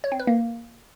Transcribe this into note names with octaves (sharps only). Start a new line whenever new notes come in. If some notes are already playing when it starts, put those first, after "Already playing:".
C#5
C4
B4
A#3